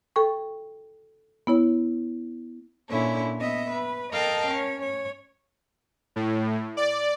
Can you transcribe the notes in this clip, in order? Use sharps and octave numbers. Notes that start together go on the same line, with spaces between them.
A4 G5 C#6
B3 E4 C#5
A#2 D3 C#4 E4
B3 D#5 E5
B4
A4 A#4 D#5 F5 G5 A5
C#4 C#5
C#5
A2
D5